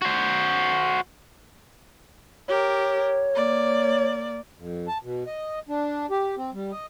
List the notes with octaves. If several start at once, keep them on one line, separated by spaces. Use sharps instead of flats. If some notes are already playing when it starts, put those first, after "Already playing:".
F#4 C5
G4 A#4 C#5
A#3 D5
F2
A5
B2
D#5
D4
G4
C4
G3
D#5